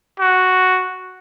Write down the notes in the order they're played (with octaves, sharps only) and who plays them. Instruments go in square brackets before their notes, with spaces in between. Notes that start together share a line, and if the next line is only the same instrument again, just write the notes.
[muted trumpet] F#4